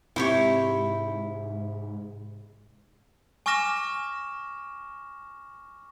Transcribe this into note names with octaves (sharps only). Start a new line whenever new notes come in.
G#2 C3 E4 G4 C#5
G#5 C#6 D6 F6 A#6 E7